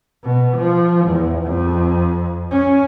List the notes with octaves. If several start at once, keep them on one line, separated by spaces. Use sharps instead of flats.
B2
F3
E2
F2
C#4